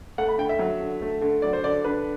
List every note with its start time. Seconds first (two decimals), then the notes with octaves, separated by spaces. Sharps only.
0.18 A3 F#5
0.28 B5
0.38 D3 G5
0.49 E5
0.59 F#3
0.80 D3
1.02 A3
1.21 D3
1.42 F#3 D5
1.53 C5
1.64 D3 D5
1.84 D4 B4